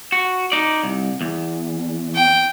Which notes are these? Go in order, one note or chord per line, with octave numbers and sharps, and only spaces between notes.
F#4
D#4 D5
C2
E2
G5